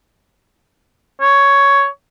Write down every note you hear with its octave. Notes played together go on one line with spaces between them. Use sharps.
C#5